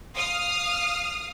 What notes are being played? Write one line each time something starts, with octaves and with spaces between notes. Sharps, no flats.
F5 D#6 F6